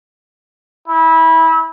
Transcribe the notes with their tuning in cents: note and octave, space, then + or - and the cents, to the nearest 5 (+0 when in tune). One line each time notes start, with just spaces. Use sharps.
E4 -25